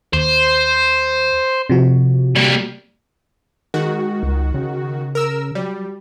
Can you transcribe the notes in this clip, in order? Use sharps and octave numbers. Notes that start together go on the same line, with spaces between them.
D#2 C5
C3 F3 F#4
G3 A#3
D#3 G#3 F#4
C#2
C#3
A#4 E6
F#3 G3